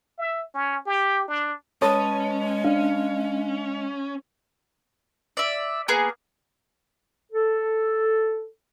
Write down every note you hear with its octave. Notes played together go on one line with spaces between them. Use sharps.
E5
C#4
G4
D4
G#3 C#4 B4 C#5 A5 D#6
D4 F5
D5 E5
A#3 B3 G#4
A4